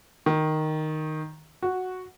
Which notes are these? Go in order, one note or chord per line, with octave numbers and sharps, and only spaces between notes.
D#3
F#4